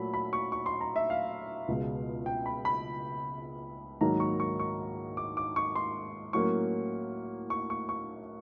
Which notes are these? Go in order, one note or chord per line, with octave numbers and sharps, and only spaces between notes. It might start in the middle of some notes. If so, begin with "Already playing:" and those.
Already playing: A#2 F#3 A3 B5
B5
C#6
C#6
C6
A#5
E5
F5
C#2 B2 G#3
G5
B5
B5
G#2 D#3 F#3 A#3 A#5
C#6
C#6
C#6
D6
D6
C#6
C6
A2 F#3 A#3 C#4 C#6
C#6
C#6
C#6